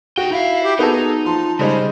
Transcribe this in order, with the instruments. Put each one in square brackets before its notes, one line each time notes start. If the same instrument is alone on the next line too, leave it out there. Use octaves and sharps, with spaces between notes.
[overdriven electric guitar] D#4 G5 [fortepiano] F#4
[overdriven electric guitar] E4 [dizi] F5
[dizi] G4
[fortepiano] B3 F#4 A4 [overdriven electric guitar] D#4 [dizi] G#4
[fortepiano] F3 C6 [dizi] A5
[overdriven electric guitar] C#3 [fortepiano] G3 G#3 D#4 [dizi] C5